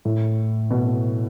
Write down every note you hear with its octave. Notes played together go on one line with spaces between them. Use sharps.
A2
B2